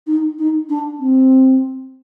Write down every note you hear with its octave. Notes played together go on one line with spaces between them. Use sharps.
D#4
D#4
D4
C4